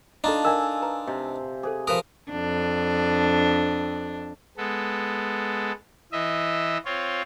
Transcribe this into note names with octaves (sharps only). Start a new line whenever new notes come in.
D4 D#4 F4 A4 A5 A#5
A#4 D#5 F5 G#5 E6
B4 A#5
C3 D#5
G#4 A4 C5 D6
F3 A#4 B4 D#6
F2 D4
G#3 B3 A4
E3 D#5 E5
C4 F4 C#5